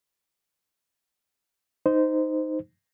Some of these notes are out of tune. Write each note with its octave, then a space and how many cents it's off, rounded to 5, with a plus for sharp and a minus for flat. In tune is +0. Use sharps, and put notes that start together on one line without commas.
D#4 +0 C5 -15